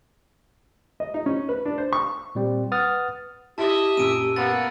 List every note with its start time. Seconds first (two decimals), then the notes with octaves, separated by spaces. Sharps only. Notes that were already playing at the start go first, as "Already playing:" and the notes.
1.00 D#5
1.14 D#4
1.26 C#4
1.49 B4
1.65 D4
1.78 C5
1.93 C#6
2.35 A#2 G3 C4
2.72 B4 F#5 D#6 F6 A6
3.58 E4 G4 D#5 E5 A5
3.97 F#2 A#2 E6 D7 D#7
4.36 A#3 B3 A6